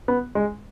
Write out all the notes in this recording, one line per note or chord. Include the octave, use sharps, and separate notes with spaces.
B3
G#3